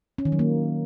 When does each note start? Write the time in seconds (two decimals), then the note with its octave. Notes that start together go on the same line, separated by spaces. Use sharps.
0.18 C#4
0.25 D#3
0.32 F#3
0.39 A#3